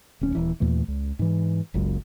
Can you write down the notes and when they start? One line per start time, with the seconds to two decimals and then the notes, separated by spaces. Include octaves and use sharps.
0.21 D1 D#2 C#4
0.35 D#1 E3
0.60 D#2 A#2 E3 A3
0.88 C#2
1.19 G#2 E3
1.74 F#1 C#2 F#2